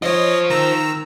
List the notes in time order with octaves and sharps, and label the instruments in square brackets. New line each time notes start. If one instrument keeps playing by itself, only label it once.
[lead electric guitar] F4 C5 [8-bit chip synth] C#5 D#5
[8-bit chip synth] D#3 A#5 E6